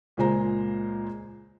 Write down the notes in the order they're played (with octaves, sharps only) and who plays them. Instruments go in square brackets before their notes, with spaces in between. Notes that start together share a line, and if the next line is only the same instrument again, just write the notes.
[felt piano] C#2 A#2 G#3 C5 A#5